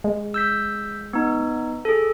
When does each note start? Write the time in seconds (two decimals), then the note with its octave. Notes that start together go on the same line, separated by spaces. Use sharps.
0.04 G#3
0.34 E6 G6 B6
1.13 B3 D#4
1.85 G#4 A4